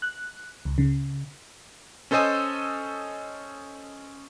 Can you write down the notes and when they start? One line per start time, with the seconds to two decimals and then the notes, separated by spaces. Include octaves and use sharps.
0.02 F#6
0.65 C#2
0.78 C#3
2.11 C#4 A4 C5 D#5 G#5